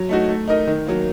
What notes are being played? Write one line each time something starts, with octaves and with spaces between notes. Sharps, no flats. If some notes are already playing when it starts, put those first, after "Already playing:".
Already playing: F#3
A3 D#4 F#4
A3
D#4 A#4 D#5
D#3
F#3 A#3